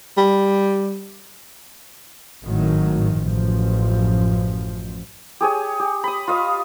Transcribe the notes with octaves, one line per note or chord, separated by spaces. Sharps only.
G3
G#1 A2 D#3 F#3
A1 F#2 F3
G4 G#4 C#5 G#5
G4
B5 D#6
F4 D#5 F5